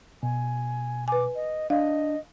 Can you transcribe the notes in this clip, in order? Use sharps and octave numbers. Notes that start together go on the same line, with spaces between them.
B2 G#5
B4 G#5 D6
D#5
D4 D#5 F5